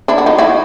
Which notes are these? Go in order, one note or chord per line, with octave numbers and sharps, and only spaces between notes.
D4 E4
F#4
D#4 F4
E4 F#4